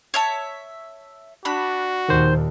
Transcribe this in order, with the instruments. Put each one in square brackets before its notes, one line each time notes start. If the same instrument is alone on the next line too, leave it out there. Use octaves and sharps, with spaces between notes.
[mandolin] C#5 E5 A5
[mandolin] D4 B5 [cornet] F#4
[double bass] D#2 A#2 [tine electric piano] D#3 C5